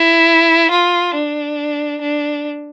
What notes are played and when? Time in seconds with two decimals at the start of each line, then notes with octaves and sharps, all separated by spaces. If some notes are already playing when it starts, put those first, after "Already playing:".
Already playing: E4
0.71 F4
1.14 D4
2.01 D4